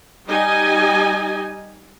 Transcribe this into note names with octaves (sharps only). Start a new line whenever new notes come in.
G3 D#4 G4 D#5 G#5